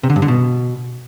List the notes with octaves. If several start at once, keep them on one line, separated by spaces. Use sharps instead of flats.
C3
D3
G2
D3
B2